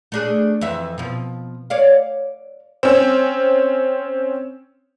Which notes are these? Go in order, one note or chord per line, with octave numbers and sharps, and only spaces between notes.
A3 D4 G#4
F2 E3 E5
B2 F3
C#5 D5 F5
C4 C#4